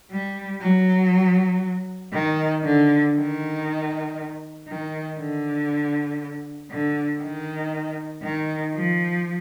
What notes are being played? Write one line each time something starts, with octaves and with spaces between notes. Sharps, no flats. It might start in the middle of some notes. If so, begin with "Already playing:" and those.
G3
F#3
D#3
D3
D#3
D#3
D3
D3
D#3
D#3
F3